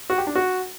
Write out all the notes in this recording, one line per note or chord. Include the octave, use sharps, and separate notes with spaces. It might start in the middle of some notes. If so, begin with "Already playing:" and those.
F#4
G4
D4
F#4